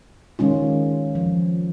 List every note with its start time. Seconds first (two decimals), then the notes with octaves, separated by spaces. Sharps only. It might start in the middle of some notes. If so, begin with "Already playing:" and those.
0.39 D#3 G#3 C#4 F4
1.15 F3